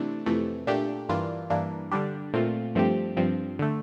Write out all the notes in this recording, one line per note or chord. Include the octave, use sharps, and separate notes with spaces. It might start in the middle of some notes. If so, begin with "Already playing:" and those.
Already playing: C3 E3 A3 D4
F2 C3 E3 A3
A#2 A3 D4 G4
G2 E3 A#3 D4 F4
G2 E3 A#3 D4
D3 G3 D4 G4
A#2 A3 C4 F4
G2 F3 A3 C4 G4
G2 F3 C4
D3 A3